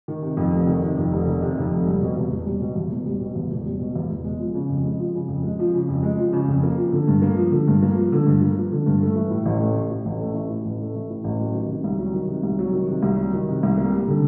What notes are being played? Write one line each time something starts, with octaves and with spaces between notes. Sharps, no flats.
D#3
C3
F2
F1
D#3
C3
F2
F1
D#3
C3
F2
F1
G3
B2
E2
E1
G3
B2
E2
E1
G3
B2
E2
E1
G3
B2
E2
E1
G#3
F3
C#3
F2
G#3
F3
C#3
F2
G#3
F3
C#3
F2
G#3
F3
C#3
F2
A#3
F3
D3
G2
A#3
F3
D3
G2
A#3
F3
D3
G2
A#3
F3
D3
G2
A3
E3
A2
A1
A3
E3
A2
A1
A3
E3
A2
A1
A3
E3
A2
A1
F#3
D#3
C3
C2
F#3
D#3
C3
C2
F#3
D#3
C3
C2
F#3
D#3
C3
C2
A#3
G3
D3